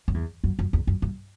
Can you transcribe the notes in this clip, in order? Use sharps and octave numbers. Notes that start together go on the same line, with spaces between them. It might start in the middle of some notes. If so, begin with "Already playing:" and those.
F#2
E2
F#2
F#2
E2
F#2
G2